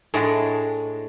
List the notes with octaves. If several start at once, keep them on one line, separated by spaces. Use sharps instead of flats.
A2 G#3 D4